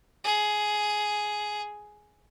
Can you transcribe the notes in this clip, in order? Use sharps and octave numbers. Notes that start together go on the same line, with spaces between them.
G#4